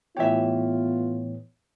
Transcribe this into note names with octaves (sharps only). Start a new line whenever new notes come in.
A2 E3 B3 F4 G4 C#5 E5